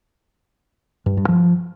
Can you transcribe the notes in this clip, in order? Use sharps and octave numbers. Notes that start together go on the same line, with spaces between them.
G2
G2
F3